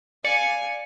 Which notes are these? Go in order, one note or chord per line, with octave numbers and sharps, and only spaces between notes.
D5 F5 G#5 C#7